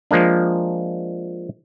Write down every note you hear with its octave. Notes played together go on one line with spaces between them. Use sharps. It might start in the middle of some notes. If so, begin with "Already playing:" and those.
F3 G#3 A#3 D4